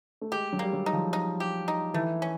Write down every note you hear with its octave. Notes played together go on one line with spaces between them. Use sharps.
A3
G#3 G4
F#3
G3 A#3
F#3
D#4
F3
D#4
G4
D#4
E3 A3
C#4